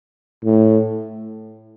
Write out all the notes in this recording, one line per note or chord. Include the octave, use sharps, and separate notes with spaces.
A2